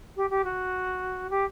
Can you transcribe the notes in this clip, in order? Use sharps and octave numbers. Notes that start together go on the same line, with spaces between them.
G4
G4
F#4
G4